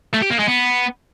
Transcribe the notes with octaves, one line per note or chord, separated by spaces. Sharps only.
A3
G4
A#3
G#3
B3